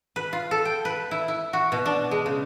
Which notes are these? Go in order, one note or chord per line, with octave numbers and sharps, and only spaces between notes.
B4
F4
A4
G5
B4
E4
E4
F#4
B2
D4
G#3
C#3